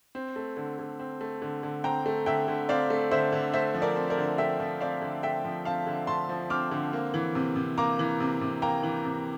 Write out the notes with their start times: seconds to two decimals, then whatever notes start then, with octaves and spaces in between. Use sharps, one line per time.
0.15 C4
0.36 A3
0.57 D3
0.79 D3
0.99 C4
1.21 A3
1.42 D3
1.63 D3
1.84 C4 G5 A#5
2.06 A3
2.26 D3 E5 G5
2.48 D3
2.69 C4 D5 F5
2.90 A3
3.11 D3 C5 E5
3.32 D3
3.53 A3 C5 E5
3.74 F3
3.82 A#4 D5
3.96 C4
4.10 A#4 D5
4.18 D3
4.38 A3 E5 G5
4.60 F3
4.80 C4 D5 F5
5.02 D3
5.23 A3 E5 G5
5.45 F3
5.65 C4 F5 A5
5.87 D3
6.07 A3 A5 C6
6.29 F3
6.50 C4 D6 F6
6.71 D3
6.93 A#3
7.14 E3
7.35 C3
7.56 C3
7.78 A#3 A#5 D6
7.99 E3
8.20 C3
8.41 C3
8.62 A#3 G5 A#5
8.83 E3
9.05 C3